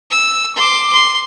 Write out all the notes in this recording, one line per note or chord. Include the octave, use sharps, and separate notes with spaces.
E6
C6 D6
C6